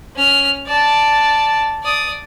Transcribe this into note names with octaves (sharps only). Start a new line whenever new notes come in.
C#4 F6
D5 A5
D5 D#6